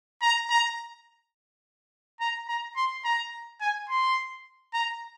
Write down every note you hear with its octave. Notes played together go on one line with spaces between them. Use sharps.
A#5
A#5
A#5
A#5
C6
A#5
G#5
C6
A#5